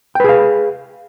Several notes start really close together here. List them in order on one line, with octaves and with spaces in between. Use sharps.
G5 B4 G#4 F5